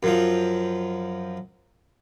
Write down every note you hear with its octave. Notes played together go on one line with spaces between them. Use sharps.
F#2 F3